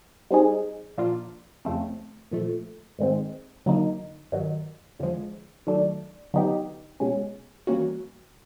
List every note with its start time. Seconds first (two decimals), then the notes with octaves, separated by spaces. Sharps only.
0.30 G3 C4 D#4 G#4
0.98 A#2 F3 A#3 D4 F4
1.65 F2 C#3 F3 A3 C4
2.31 A#2 F3 A3
2.99 G#2 D#3 G#3 C4
3.66 D3 F#3 A#3 D#4
4.32 G2 D#3 F#3
4.99 F2 D3 F3 G#3
5.67 D#3 F#3 A3 D4
6.34 D3 F#3 B3 D#4 G4
7.00 B2 G#3 C#4
7.67 E3 G3 A#3 C#4 F#4